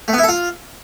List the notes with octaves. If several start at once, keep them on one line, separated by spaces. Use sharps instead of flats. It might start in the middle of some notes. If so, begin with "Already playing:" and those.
A3
B3
E4
A4
F4